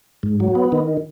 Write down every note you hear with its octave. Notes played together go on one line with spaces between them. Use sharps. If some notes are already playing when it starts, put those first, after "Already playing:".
G#2
F#3
B3
D#3